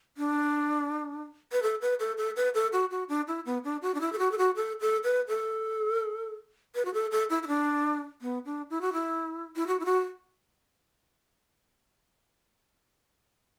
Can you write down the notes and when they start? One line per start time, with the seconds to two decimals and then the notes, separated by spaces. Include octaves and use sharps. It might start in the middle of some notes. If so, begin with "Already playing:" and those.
0.17 D4
1.52 B4
1.63 A4
1.82 B4
2.00 A4
2.18 A4
2.36 B4
2.54 A4
2.73 F#4
2.91 F#4
3.09 D4
3.28 E4
3.46 B3
3.64 D4
3.82 F#4
3.94 D4
4.01 E4
4.13 A4
4.19 F#4
4.32 A4
4.38 F#4
4.56 A4
4.81 A4
5.04 B4
5.28 A4
6.75 B4
6.85 F#4
6.94 A4
7.12 A4
7.30 E4
7.43 E4
7.48 D4
8.22 B3
8.45 D4
8.70 E4
8.81 F#4
8.93 E4
9.56 E4
9.67 F#4
9.80 E4
9.85 F#4